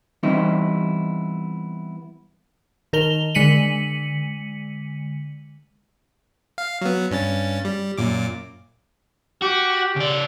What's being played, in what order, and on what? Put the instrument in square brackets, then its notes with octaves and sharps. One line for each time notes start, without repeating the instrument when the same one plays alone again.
[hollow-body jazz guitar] E3 G3 B3 C4 D#4 E4
[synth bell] D#3 A#4 F7 G7
D3 G#3 B6 C#7 D#7 F#7
[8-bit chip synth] F5
F#3 B3
G2 C#4 A6
G3
F#2 A#2 D6
[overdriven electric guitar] F#4 [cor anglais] G4
[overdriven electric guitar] C#3 D5